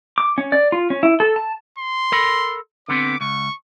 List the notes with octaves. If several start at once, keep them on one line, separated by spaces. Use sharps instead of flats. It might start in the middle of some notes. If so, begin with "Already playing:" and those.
D6
C#4
D5
F4
C#4
E4
A4
A5
C6
A4 A#4 B5
D3 B3 C4 D6
C#2 C#6